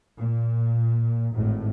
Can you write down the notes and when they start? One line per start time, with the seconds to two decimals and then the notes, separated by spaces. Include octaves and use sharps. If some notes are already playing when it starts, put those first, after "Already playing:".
0.18 A#2
1.34 G#1 A2